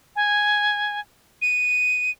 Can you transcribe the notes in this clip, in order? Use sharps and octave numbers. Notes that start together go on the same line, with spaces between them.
G#5
D#7